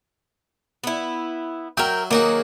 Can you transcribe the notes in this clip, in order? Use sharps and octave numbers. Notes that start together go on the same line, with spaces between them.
B3 E4
F#3 A#4 E5 G5
D#3 F#3 A#3 F#4 G#4